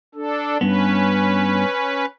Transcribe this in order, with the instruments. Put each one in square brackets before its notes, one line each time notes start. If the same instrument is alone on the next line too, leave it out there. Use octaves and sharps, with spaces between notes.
[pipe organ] D4 A4
[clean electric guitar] G2 B3 [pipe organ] C#4 B4